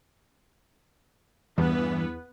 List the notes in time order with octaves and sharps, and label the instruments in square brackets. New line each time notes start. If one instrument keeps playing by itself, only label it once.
[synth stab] E2 [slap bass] G2 G3 [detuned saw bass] E3 [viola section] B3 B4